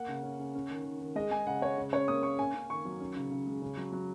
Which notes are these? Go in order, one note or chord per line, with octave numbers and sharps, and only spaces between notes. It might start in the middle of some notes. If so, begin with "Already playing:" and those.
Already playing: A#3 F#5
C#3
C#4
C#3
C#4
D#3
D#3
D#3
G#3 D#5
G#3 G#5
C#3 F#5
G#3 C#5
C#3
C#4 C#5
A#3 D#6
A#3 C#6
C#4 G#5
C#4
D#3 C#6
F#3
C#4
C#3
C#3
G#3
C#3
F#3
F#3